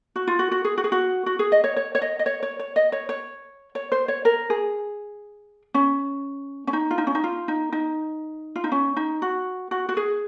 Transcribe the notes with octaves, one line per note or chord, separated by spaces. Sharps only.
F#4
F4
F#4
F#4
G#4
F#4
G#4
F#4
F#4
G#4
D#5
C#5
C#5
C#5
D#5
D#5
C#5
C#5
C#5
D#5
C#5
C#5
C#5
C5
C#5
A#4
G#4
C#4
C#4
D#4
F4
D#4
C#4
D#4
F4
D#4
D#4
F4
D#4
C#4
D#4
F#4
F#4
F#4
G#4